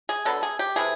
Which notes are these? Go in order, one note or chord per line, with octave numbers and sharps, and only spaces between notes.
G#4
D3 F#3 B3 A4
G#4
G4
C3 E3 A3 G#4